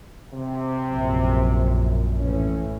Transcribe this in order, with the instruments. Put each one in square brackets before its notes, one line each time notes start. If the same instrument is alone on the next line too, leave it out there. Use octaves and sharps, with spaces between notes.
[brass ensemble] C3
[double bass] A#1 F#2
[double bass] A2 [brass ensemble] E3 C#4